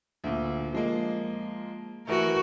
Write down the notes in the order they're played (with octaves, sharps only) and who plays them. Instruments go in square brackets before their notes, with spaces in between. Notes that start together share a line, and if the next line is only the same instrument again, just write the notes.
[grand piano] D2 A#2
F3 G#3 A#3
[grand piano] E3 A3 [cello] F#4 A#4